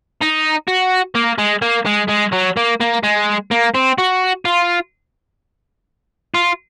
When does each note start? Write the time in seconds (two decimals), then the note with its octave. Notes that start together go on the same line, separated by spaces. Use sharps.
0.21 D#4
0.68 F#4
1.15 A#3
1.39 G#3
1.62 A#3
1.86 G#3
2.09 G#3
2.33 F#3
2.57 A#3
2.80 A#3
3.03 G#3
3.51 A#3
3.74 C4
3.98 F#4
4.45 F4
6.34 F4